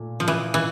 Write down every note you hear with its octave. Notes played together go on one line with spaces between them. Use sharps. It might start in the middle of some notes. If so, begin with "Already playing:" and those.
Already playing: A#2 A3
F3
E3
E3